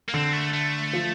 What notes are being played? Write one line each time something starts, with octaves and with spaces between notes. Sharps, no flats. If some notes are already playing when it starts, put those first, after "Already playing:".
A#3
D3 C4
A3
A3
F3